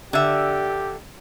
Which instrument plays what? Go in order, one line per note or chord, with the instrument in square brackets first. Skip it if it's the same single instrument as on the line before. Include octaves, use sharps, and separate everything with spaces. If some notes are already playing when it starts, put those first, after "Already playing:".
[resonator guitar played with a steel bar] D3 E5 [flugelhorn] G4